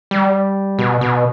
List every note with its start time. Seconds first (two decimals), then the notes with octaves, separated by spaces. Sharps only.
0.11 G3
0.79 B2
1.01 B2